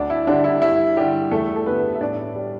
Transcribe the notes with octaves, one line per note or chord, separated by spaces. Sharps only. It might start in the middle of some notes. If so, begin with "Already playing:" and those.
Already playing: D2 D4 D5
E4
D3 G3 D4
E4
G2 E4
D3 G3 G4
E2 A3 A4
A4
D3 G3 B3 B4
E5
A2 D4 D5
G3